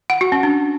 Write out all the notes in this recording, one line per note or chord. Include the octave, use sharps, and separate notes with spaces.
F#5
F#4
C#4
D4